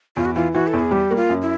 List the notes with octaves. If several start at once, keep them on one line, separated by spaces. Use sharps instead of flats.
E2 F4
F#4
E3 F4
E3 F#4
A4
E2
G#4
G3 G4
A#3 F#4
F4
F#2
E4